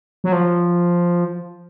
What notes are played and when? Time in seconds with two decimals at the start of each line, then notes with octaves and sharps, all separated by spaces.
0.24 F#3
0.32 F3